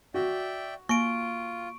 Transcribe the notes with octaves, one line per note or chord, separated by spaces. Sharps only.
F#4 D5 E5 G5
A#3 F4 C#6 D7